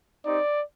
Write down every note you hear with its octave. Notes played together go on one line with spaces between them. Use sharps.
C4 D#4 G4 D5